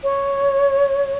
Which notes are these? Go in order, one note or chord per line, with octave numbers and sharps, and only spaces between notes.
C#5